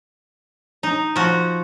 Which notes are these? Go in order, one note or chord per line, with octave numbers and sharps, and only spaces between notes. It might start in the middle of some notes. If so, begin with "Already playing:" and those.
D#4
F3 F#4